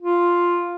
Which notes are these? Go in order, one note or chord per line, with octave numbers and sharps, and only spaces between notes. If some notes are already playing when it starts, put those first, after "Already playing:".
F4